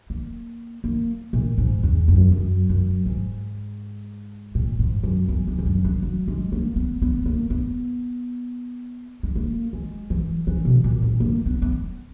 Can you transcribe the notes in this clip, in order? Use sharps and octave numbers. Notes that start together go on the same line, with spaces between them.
A#3
A#3
A#2
G#2
E2
F#2
F#2
F#2
G#2
A#2
G#2
F#2
E2
E2
G#2
F#2
E3
F#3
G#3
A#3
B3
B3
A#3
B3
G#3
A#3
G#3
E3
E3
B2
A#2
G#3
A#3
B3
B3